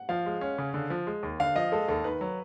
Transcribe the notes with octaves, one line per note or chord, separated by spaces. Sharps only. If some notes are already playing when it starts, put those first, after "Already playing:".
Already playing: F#5
F3 F5
G#3
C#4
C#3
D3
F3
G#3
D#2
D3 F5
F3 D#5
G#3 A4
D#2 A4
D#3 B4
F#3